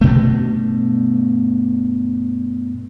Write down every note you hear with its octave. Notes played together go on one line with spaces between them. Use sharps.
G2 B2 A3